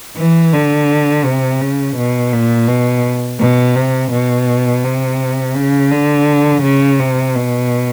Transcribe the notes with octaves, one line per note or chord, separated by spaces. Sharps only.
E3
D3
C3
C#3
B2
A#2
B2
B2
C3
B2
C3
C#3
D3
C#3
C3
B2